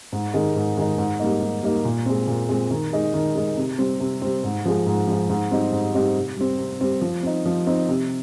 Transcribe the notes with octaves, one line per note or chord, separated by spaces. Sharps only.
G#2
D#3 G#3 D#4
G#2
D#3 G#3 D#4
G#2
G3 A#3 D#4
G#2
G3 A#3 D#4
A#2
G#3 C4
A#2
G#3 C4
D#3
G#3 D#4
D#3
G#3 D#4
C3
G3 C4
C3
G3 C4
G#2
F3 G#3
G#2
F3 G#3
G#2
G3 C4 D#4 G4
G#2
G3 C4 D#4 G4
C3
G3 C4
C3
G3 C4
F3
C4 D#4
F3
C4 D#4
C3